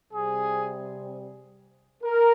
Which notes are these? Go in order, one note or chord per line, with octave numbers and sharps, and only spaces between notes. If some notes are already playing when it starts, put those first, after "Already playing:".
C3 G3 C4 G#4
A#4